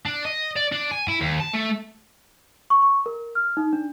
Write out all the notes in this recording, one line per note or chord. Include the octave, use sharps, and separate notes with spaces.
D4
D#5
D5
D4
G#5
E4
D#2
A5
A3
C#6
C#6
A#4
F6
D#4
D4